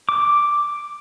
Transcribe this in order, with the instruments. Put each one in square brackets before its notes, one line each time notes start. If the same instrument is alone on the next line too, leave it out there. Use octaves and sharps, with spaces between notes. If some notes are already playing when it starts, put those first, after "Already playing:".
[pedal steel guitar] D6